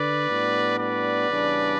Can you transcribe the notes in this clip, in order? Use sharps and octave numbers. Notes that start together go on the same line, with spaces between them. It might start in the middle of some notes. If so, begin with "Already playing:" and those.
Already playing: D3 B4 D5
A2 G3 B3 D4
B4 D5
E2 C#3 G3 D4